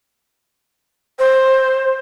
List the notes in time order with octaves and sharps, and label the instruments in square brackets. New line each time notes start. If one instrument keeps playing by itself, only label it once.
[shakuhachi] C5